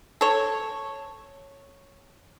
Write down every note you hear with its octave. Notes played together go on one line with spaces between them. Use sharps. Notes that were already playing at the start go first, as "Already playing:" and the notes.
A4 C#5